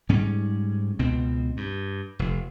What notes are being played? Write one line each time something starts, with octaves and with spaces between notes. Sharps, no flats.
G#2 G3 C#4
C#2 B2 C4
G2
F1